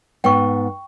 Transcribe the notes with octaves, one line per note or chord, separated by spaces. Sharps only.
G#2 B3 G5 C#6